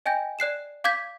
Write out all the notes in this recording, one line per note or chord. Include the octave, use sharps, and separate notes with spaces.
D#5 G5 G#5 G6 A#6
D5 F#6 C7 E7
F5 D6 G6 G#6 B6